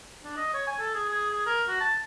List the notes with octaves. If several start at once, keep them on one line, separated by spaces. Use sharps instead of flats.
D4
D#5
C#5
G#5
A4
G#4
G#4
G#4
A#4
F#4
A5